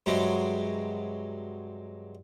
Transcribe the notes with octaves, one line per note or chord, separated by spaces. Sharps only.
G2 C3 F#3 G#3